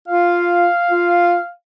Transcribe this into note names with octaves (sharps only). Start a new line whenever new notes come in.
F4 F5
F4